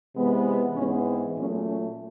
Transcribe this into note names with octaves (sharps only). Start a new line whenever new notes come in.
C3 E3 G#3 B3
G#2 E3 G#3 B3 C#4
C4
A#2 F#3 A3 C#4
C#4